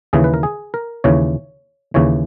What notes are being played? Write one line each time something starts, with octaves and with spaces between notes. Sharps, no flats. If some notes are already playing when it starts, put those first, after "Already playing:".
D#2 C#3 E3 G#4
B4
A#4
G#4
A#4
D#2 C#3 E3 C#5
D#2 C#3 E3 C#5